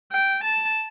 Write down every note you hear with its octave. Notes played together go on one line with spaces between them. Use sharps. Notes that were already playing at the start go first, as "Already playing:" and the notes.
G5
A5